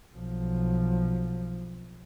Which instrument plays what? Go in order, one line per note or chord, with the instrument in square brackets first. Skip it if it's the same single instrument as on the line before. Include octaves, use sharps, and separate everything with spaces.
[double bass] B1 F3